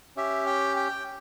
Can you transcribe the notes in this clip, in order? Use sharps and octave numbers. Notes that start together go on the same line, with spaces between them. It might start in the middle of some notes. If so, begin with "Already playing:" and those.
C#4 G4 E5
G5
G5